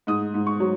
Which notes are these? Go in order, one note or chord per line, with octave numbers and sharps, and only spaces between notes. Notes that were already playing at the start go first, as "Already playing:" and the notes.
G#2 D#6
G#2
C#6
F#3